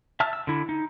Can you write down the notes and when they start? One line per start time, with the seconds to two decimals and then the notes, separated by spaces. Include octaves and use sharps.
0.20 E5 A5 E6 F6
0.33 E6
0.47 D3 E4
0.69 D#4